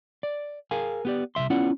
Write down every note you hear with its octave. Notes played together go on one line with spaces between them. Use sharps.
D5
G#4 A#4 F5 G#5
B3 G4 D5
C2 G2 E5 C6
B3 C#4 E4 F4 D5 F#5